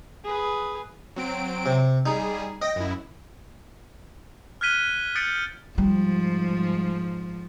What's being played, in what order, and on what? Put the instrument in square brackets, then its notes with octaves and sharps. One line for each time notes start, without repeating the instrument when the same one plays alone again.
[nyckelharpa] G#4 B4
[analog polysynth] F#3 C4 D7
[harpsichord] C3
[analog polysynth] G3 G#4 [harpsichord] D#4
[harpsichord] D#5 [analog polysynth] G5 A#6
[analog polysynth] F#2 E4
[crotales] F6 F#6 G#6 B6 D#7 G7
D#6 G6 A6 B6 C#7 D7
[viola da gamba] G#2 F3 [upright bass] G3